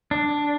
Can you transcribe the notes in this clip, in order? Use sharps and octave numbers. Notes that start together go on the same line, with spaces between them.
D4